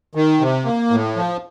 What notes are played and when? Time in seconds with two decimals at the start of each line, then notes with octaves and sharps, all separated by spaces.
0.15 D#3
0.40 C3
0.65 A#3
0.91 A2
1.16 F3